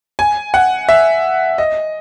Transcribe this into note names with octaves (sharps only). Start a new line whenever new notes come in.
G#5
F#5
E5
D#5